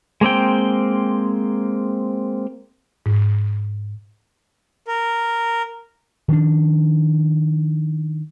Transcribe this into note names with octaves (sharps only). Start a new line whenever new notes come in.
G#3 A#3 C4 G5
G#2
A#4
D#3 F3 D4